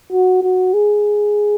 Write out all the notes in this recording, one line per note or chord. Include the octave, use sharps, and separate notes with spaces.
F#4
F#4
G#4